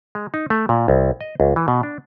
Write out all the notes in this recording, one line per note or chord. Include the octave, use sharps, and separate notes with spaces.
G#3
D#4
A3
A#2
C2
D#5
C#2
E3
B2
D4